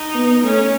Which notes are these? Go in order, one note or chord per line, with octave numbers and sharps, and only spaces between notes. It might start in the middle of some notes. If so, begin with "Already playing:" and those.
Already playing: D#4
B3
A3 C#4